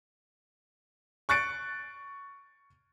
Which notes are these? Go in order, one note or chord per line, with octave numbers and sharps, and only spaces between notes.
C#6 F#6 A6 C#7 D7